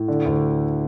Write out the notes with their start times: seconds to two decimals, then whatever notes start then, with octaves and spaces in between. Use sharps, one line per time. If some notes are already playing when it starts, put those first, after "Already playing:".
Already playing: A2
0.08 D3
0.26 D2